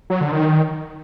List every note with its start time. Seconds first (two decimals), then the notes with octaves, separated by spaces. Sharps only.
0.10 F#3
0.21 D3
0.32 D#3